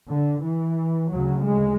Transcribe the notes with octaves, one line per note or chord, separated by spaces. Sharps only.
D3
E3
D2 C#3 F#3
G#3